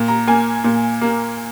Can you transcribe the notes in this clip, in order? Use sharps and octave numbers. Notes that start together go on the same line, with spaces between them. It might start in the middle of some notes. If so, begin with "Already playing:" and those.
Already playing: A#2
A#5
A#3 G#5
A#2
A#3